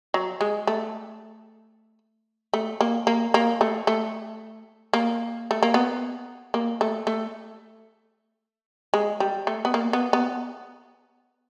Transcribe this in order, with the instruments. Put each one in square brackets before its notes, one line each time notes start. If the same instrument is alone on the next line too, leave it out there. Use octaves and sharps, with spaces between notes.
[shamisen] F#3
G#3
A3
A3
A#3
A#3
A#3
A3
A3
A#3
A3
A#3
B3
A#3
A3
A3
G#3
G3
A3
B3
A#3
B3
B3